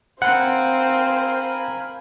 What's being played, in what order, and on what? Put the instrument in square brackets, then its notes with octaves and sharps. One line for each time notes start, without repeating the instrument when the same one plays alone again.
[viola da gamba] C4 [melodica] A#4 G#5 B5 [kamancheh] C5 F5 [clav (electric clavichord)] F#5